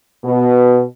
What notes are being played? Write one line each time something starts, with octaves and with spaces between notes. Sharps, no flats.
B2